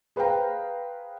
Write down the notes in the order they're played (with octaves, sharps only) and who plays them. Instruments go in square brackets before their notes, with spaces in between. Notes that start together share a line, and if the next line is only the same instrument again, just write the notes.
[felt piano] G#4 B4 C5 F5 G5 A#5